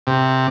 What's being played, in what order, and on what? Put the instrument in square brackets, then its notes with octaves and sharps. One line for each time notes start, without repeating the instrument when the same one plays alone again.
[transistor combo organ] C3